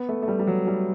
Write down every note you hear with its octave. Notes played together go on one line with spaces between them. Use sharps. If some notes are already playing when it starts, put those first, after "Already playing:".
Already playing: B3
A3
A3
G3
G3
F#3
G3